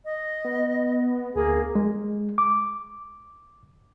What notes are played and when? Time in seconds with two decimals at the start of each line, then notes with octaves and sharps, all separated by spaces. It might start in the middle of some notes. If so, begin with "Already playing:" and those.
0.05 D#5
0.45 B3
1.35 D2 A#3 G#4
1.75 G#3
2.38 D6